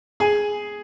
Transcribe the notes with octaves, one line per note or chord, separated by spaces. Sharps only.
G#4 G#5